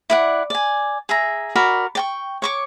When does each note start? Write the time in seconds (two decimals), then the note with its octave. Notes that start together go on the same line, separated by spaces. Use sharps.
0.10 E4 D5 F#5
0.50 D5 G#5
1.09 G#4 E5 A#5
1.55 F#4 A#4 D5 B5
1.95 D5 G5 C#6
2.42 C#5 C#6 D6